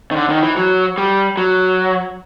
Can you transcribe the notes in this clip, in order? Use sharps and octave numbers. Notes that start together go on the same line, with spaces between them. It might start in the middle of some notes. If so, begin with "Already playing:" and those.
D#3
D3
D#3
E3
F#3
G3
F#3